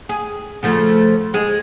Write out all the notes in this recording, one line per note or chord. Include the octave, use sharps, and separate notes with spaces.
G#4
C#3 F3 A3
G#3 G#4